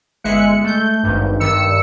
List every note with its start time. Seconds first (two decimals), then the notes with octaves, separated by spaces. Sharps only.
0.24 G1 G#3 E5 F#6 C#7
0.64 A3 G6
1.03 G#1 G2
1.40 G2 D#3 E6 C#7